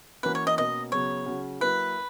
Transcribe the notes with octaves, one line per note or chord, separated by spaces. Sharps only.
E3 A#3 C#4 F#4 B4
C#5
D#5
B2 A#3 C#4 D#5
C#3 F#3 B3 F#4 C#5
C#3 F#3 C#4 F#4
F#3 A#3 E4 B4